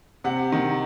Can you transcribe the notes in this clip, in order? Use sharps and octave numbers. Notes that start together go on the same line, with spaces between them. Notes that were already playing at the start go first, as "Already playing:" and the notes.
C3 F#5
D#3